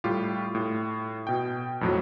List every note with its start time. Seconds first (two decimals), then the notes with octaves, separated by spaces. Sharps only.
0.04 A2 G3 F4 G4
0.55 A2
1.27 B2 G5
1.81 F2 A2 F#3